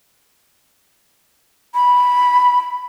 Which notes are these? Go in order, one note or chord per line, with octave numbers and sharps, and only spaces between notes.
B5